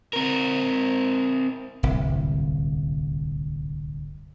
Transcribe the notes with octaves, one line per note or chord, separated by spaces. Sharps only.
C4 A#4
D1 G1 C2